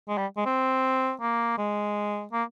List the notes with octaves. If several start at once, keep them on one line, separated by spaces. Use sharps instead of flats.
G#3
G3
G#3
C4
A#3
G#3
A#3